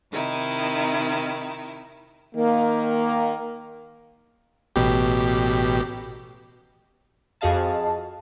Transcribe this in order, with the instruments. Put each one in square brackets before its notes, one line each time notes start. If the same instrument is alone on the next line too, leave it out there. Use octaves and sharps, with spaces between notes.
[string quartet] C3 D#3 D#4 E4
[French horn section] D#3 A#3
[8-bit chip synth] A1 B2 G4
[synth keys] F2 F#4 G#4 D#5 F5 A5